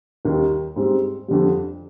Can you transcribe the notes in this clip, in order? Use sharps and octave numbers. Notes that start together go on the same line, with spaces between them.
D#2 D#3 G3
G#2 G3 C4
F2 D3 G3